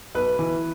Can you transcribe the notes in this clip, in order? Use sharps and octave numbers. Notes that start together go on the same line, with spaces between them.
B1 B4
E3